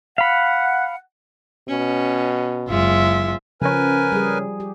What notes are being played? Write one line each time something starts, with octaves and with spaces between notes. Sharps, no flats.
F5 F#5 B5
B2 C#4
F#1 G#3 F4 E5
C#3 F3 C#4 A#4 B4 G#5
G3 G#4
G4